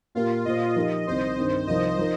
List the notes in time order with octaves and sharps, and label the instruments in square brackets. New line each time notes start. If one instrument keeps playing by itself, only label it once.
[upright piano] A#2 A#3 G4 A#4 [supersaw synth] F4
[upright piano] A#2 A#3 F4 C5 [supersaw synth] D#5
[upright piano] F3 D#4 G4 A#4
[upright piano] C2 C3 D#3 [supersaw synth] C5
[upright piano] G2 D#3 C4
[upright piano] C2 C3 F3 D#4 A#4 [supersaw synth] D#5
[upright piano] F3 D#4 A#4